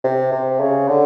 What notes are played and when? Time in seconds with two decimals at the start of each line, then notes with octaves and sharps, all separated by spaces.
0.04 C3
0.32 C3
0.60 C#3
0.88 D3